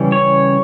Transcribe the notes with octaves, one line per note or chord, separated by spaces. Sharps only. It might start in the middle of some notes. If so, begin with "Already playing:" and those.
Already playing: C#3 E3 G3 C#4
C#5